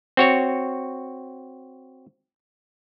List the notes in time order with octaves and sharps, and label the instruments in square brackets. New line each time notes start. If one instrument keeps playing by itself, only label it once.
[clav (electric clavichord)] C4 F#4 C#5